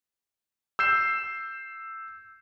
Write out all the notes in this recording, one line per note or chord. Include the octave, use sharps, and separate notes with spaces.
E6 G6 C7 E7